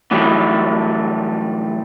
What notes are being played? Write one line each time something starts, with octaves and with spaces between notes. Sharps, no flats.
A2 E3 F#3 G3